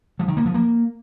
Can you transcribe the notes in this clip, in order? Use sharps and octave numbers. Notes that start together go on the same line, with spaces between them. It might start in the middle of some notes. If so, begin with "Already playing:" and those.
F3
D#3
A#3
F3
A#3